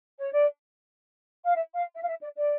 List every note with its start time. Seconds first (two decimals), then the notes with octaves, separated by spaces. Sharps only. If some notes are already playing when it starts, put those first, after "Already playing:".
0.20 C#5
0.32 D5
1.44 F5
1.54 E5
1.74 F5
1.94 E5
2.02 F5
2.08 E5
2.22 D5
2.35 D5